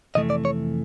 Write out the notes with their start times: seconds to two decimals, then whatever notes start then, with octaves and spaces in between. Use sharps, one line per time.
0.15 F2 C3 E3 A3 D#5
0.30 D5
0.45 C#5